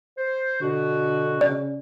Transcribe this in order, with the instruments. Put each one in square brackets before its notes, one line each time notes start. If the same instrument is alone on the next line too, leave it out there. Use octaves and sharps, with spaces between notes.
[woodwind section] C5
[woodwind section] B2 F#4 [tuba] D3
[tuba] C#3 [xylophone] D5